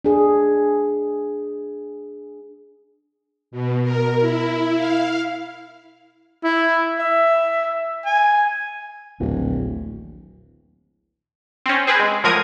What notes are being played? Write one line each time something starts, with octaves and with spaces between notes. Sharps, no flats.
D4 G#4
B2
A#4
E4
F5
E4
E5
G#5
D1 A#1 D#2 A#2
C4 C#4
C4 G#4 B4
G#3
A2 F3 F#3 A#4 D#6 G#6